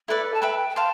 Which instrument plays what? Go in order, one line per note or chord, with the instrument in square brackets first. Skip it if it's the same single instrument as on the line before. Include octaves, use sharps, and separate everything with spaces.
[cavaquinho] E4 B4 D5 [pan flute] A4
[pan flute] A5
[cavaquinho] B4 E5 B5 [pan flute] G5
[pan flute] G5
[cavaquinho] C5 F5 [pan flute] A5